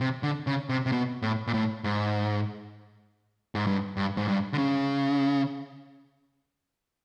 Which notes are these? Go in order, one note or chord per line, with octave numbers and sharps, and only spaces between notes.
C3
D3
C#3
C3
C3
B2
A2
A#2
A2
G#2
G#2
G2
G2
G#2
G2
D3
C#3